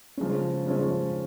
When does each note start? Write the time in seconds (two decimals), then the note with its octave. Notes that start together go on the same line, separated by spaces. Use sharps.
0.17 C#3 F3 G#3 C#4
0.66 C#3 F3 G#3 C#4